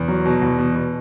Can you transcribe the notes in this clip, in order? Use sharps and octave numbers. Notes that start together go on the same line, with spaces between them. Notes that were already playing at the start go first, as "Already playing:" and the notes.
Already playing: E2
F#3
B2
E2
B2
B2